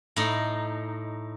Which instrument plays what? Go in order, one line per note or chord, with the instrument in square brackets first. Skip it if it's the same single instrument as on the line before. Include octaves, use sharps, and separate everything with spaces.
[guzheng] A2 D#4